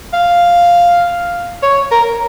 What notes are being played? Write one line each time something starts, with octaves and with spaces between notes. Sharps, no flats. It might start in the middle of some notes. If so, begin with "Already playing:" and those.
F5
C#5
A#4